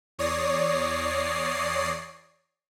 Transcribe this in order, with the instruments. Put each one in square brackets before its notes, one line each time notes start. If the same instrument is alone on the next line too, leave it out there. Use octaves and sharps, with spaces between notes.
[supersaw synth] E2 C#5 D5 D#6 A#6 C7